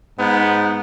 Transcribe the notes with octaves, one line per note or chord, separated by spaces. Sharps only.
G#2 B3